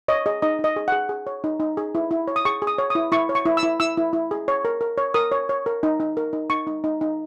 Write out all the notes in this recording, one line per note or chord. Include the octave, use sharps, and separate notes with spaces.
C#5 D#5
G#4 D#5
D#4 D#5
D#4
D#5
G#4
G#4 F#5
G#4
C#5
D#4
D#4
G#4
E4
E4
C#5
D#6
G#4 C#6
G#4
D#6
C#5
E4 D#6
E4 C#6
C#5
C#6
E4
E6
E4
E4 E6
E4
E4
G#4
C#5
A#4
A#4
C#5
A#4 D#6
C#5
C#5
A#4
D#4
D#4
A#4
D#4
D#4 C#6
D#4
D#4
D#4